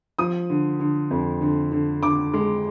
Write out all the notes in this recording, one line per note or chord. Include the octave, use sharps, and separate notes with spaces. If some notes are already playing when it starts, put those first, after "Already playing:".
F3 D#6
D3
D3
F2
D3
D3
D3 D6
G#3